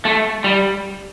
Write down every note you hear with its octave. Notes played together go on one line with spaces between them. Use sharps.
A3
G3